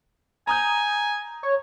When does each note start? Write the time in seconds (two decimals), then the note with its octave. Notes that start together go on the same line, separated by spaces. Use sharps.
0.47 G#5 A#5 D#6 G6
1.43 C#5